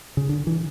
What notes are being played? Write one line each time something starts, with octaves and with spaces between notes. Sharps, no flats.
C#3
D3
E3